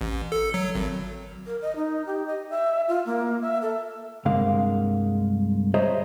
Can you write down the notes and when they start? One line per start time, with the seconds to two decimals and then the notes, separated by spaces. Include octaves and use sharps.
0.01 A1
0.32 A4
0.54 F#3
0.75 G#1
1.46 A#4
1.62 D#5
1.76 D#4
2.06 G4
2.27 D#5
2.50 E5
2.88 F4
3.06 A#3
3.42 E5
3.62 A4
4.25 C2 G2 D3 G#3 A#3 F5
5.74 G#4 C5 C#5 D#5 E5 A#5